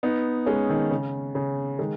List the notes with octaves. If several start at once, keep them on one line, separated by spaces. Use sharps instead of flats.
B3 D#4
G#3 C#4
D#3
C#3
C#3
D#3 G#3